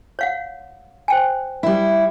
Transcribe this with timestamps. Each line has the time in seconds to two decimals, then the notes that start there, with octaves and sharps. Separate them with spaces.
0.19 C#5 F5 F#5
1.08 C5 G5 G#5
1.63 G3 E4